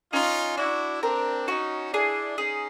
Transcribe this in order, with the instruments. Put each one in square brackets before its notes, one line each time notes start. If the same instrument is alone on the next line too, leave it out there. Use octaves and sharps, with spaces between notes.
[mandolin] C#4 [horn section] D#4 F4
[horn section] D4 E4 [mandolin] F#4
[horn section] C4 D4 [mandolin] A#4
[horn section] C#4 D#4 [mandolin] F#4
[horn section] D4 E4 [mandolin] G#4
[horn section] C#4 D#4 [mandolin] G#4